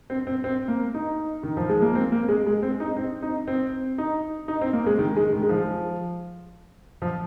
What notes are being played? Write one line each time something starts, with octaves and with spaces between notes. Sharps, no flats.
C4
C4
C4
A#3
D#4
D#3
F3
G#3
A#3
C4
A#3
G#3
G#3
C4
D#4
C4
D#4
C4
D#4
D#4
C4
A#3
G#3
D#3
G#3
D#3
G#3
F3
F3